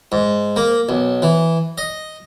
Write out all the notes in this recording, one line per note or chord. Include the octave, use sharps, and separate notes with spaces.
G#2
A#3
B1
E3
D#5